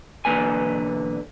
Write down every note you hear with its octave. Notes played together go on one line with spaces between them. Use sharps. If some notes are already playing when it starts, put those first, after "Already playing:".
B1 E2 D3 A#3 B4 G#5